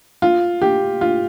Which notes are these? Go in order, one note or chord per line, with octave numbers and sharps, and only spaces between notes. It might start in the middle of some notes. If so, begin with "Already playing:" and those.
F4
G4
F4